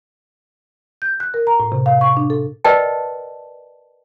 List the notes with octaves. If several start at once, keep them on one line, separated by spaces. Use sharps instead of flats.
G6
F#6
A#4
A#5
A2
C3
F5
C#6
D4
A4
A#4 B4 D5 D#5 G5 A5